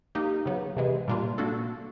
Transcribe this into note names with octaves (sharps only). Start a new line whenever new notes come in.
A#3 D#4 G4
C#3 F#3 B3
C3 E3 G#3
A#2 G3 A#3 D4 F4
A#3 D4 F#4 A4